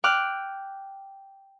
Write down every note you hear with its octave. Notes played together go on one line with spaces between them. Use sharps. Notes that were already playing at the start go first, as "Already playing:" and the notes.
G5 D6 F6 F#6